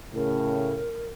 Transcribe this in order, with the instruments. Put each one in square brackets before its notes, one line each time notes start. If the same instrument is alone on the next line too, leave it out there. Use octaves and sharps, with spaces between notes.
[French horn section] A2 C#3 [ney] A#4